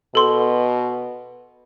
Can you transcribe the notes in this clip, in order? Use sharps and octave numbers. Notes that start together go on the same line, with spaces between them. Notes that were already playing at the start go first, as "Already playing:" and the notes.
B2 A4 C6